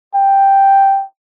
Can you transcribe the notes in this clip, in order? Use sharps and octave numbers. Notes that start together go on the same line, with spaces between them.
G5